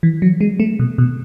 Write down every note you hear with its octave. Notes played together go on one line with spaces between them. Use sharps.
E3
F#3
G#3
A3
B2
B2